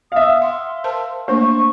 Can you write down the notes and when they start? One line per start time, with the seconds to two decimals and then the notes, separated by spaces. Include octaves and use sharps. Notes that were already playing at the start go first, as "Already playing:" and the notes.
0.12 E5 F5 D#6
0.42 F#5 C6
0.84 A#4 C5 A5
1.28 A3 A#3 D4 C5 C#6